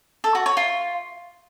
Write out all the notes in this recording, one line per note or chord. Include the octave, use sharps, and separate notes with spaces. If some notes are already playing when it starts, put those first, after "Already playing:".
A4
F#4
C#5
F4